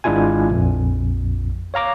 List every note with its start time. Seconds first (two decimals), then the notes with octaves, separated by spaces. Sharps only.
0.04 G#1 G#3 D4 E4 F4 G#5
0.51 A#1 F2
1.74 C#5 F5 A#5 D6